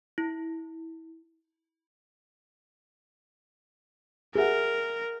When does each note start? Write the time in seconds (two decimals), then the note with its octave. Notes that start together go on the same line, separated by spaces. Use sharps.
0.18 E4
4.35 G#4 A#4 E5 F#5